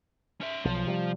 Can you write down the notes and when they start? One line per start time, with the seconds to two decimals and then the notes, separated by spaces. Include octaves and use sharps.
0.41 C#4 E5
0.65 B1 F3
0.87 C3 F#3 G3